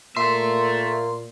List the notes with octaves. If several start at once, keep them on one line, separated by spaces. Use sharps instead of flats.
A#2 A#3 A4 E5 C6